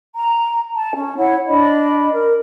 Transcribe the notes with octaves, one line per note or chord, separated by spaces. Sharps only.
A#5
A5
C#4
E4 C#5 F#5
D4 D#5 B5
A#4